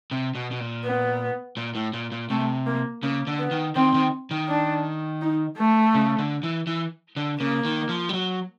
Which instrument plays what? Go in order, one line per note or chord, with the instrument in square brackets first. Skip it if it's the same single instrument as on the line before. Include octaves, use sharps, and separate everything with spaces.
[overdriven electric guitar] C3
B2
B2
A#2
[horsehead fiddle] B3
[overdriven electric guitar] A#2
A2
A#2
A#2
[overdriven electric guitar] C3 [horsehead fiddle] A3
[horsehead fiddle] A#3
[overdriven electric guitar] C#3 [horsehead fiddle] A#3
[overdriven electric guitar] D3
[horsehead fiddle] B3
[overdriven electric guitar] D#3
[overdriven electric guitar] D#3 [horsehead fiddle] C4
[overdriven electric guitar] D#3
D#3
[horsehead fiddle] D4
D#4
A3
[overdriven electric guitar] C#3
D3
E3
E3
D3
[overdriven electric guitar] C#3 [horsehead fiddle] A#3
[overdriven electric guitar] D#3
F3
G3
F#3